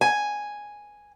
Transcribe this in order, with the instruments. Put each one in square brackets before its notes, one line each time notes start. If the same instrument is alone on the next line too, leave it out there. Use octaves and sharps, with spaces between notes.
[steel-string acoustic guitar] G#5